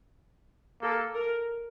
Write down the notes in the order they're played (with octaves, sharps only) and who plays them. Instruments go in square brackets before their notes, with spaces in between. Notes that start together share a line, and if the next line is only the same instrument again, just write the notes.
[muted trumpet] A#3 [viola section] A4
[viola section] A#4